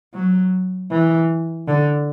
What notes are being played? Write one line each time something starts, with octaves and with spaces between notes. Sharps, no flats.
F#3
E3
D3